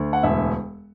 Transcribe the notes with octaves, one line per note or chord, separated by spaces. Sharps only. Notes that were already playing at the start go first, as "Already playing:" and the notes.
Already playing: D2
F#5
E1 E5